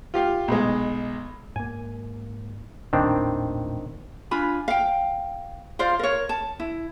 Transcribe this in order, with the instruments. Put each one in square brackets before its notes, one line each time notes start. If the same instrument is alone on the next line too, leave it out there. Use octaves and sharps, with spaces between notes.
[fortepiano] F4 G4 F5
B1 G#3
[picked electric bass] G#2 A#3 [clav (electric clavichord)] G#5
[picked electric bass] A1 E2 A#2 [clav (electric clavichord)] D#3 C4 D4
[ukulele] D4 F4 G#5 B5
F5 G5
F4 C5 D5 F5
A#4 C#5
A5
E4